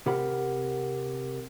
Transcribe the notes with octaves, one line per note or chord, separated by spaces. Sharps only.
C3 G4 A#4 F#5 B5